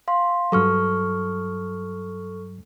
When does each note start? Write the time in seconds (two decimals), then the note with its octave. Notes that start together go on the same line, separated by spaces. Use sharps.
0.08 F5 C6
0.52 G2 F#3 A4 C#6 F6